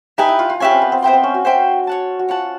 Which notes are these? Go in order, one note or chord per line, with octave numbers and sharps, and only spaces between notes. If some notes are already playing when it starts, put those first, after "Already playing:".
D#4 G4 B4 E5 G#5
E4
F4
F4
C#4 G4 B4 E5 G#5
C4
B3
C4
B3 C5 E5 G5 C6
C4
C#4
F#4
C5 E5 G5 C6
C#5 F#5 A5
F#4
F4 C#5 F#5 A5